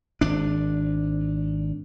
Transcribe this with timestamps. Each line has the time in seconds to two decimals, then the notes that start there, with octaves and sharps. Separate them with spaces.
0.21 G#1 D4